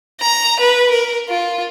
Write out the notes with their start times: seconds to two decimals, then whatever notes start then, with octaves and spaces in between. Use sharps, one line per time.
0.21 A#5
0.60 B4
0.91 A#4
1.29 F4